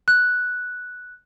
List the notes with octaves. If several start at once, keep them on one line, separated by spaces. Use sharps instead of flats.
F#6